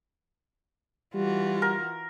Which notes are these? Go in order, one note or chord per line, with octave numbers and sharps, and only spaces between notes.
E3 G3 F4 F#4
A#4